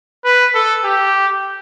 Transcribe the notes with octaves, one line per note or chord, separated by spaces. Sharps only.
B4
A4
G4